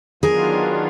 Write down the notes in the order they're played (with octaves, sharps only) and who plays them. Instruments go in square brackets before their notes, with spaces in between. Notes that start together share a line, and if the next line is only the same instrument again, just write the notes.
[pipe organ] D#3 F#3 B3 D4 F4 [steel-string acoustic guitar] G#4 A#4